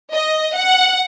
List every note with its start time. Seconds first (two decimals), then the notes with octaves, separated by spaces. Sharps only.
0.13 D#5
0.54 F#5